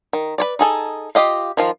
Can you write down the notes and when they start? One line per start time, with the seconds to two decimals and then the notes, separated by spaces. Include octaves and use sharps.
0.13 D#3
0.38 B4 C#5 D5
0.59 D#4 G#4 A4
1.15 F4 G4 D#5 F5
1.57 D#3 F3 F4